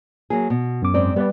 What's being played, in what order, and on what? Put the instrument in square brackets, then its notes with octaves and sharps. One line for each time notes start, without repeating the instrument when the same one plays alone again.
[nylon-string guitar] F#3 A#3 G#4
B2
[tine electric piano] F#2 D6
[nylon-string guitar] G#2 C4 D5
[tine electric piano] G3 B4 D5 [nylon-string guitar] B3